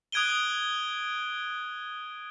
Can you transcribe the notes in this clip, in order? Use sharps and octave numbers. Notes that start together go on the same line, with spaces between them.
D#6 F#6 G#6 D7 D#7 G7